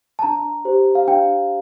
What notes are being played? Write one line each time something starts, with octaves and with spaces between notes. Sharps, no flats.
A5
D4 A#5
G4 C5
F5
D4 G5